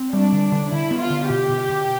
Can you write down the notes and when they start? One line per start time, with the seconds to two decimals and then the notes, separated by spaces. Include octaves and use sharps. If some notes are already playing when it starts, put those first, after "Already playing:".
Already playing: C4
0.13 G3 D4
0.33 D3
0.52 D3
0.72 D3 E4
0.91 B3
1.00 F4
1.10 D3
1.30 B2 G4
1.50 B2
1.70 B2